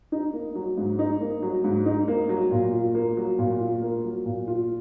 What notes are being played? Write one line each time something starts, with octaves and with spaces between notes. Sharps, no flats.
D#4
A#3
F#3
G#2
D#4
A#3
F#3
G#2
D#4
A#3
F#3
A#2
F4
A#3
F#3
A#2
F4
A#3
F#3
A#2
F4